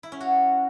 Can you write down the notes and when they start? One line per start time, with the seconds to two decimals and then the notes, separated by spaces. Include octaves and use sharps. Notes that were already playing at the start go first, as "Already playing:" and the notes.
0.03 E4
0.12 C#4
0.21 F#4